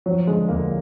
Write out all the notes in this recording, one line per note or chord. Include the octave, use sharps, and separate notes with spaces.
F3 F#3
D3 G#3
D2 A#3